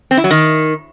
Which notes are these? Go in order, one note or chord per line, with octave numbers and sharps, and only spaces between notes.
C4
E4
F#3
D#3